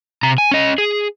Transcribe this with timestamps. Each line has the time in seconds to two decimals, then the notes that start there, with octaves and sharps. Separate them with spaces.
0.23 C3 A#5
0.38 G#5
0.51 C#4 D#5
0.78 G#4